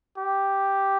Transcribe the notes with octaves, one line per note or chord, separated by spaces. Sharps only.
G4